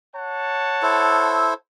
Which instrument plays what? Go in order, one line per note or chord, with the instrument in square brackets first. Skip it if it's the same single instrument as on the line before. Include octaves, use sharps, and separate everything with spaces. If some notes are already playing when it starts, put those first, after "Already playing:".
[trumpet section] C#5 F#5 A5
[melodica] E4 A4 C5